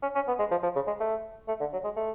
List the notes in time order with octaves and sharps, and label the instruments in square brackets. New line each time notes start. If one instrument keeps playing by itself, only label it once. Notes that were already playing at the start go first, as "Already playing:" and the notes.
[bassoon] C#4
C#4
B3
G#3
F3
F3
C#3
G#3
A3
A3
D3
F#3
G#3
A3